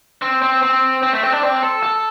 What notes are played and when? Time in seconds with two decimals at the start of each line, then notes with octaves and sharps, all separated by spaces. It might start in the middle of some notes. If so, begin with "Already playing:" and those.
0.22 C4
0.42 C4
0.62 C4
1.03 C4
1.13 A3
1.23 C4
1.32 D4
1.43 C4
1.63 A4
1.83 A4